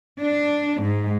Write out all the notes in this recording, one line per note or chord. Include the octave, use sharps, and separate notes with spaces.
D4
G#2